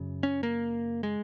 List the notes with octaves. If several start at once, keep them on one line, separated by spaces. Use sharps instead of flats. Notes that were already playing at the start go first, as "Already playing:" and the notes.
Already playing: F#2 C#3
C#4
A#3
G#3